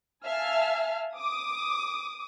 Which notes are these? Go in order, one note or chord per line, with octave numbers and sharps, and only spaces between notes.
E5 F5 G#5 A5 F6
D6 D#6